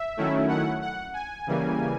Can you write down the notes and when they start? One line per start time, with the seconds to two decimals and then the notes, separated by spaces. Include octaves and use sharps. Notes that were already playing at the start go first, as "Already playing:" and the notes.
Already playing: E5
0.17 D#3 F#3 A3 C#4 E4
0.49 F#5
0.82 F#5
1.14 G#5
1.47 C#3 E3 G3 A#3